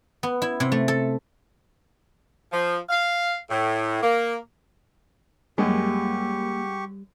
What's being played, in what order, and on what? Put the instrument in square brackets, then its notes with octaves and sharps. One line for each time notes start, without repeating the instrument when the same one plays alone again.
[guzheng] B3
E4
C3
A3
A4
[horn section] F3
F5
A2
A#3
[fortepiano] F#2 G#3 [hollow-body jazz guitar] G3 [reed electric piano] A#3 [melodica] G4 C#6